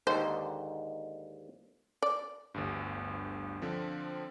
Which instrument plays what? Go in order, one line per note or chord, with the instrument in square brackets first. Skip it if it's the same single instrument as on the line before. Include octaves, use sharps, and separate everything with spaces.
[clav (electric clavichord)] D#2 G#2 D3 [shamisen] C5
[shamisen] D5
[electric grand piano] G1 D2 G2
D3 F3 C4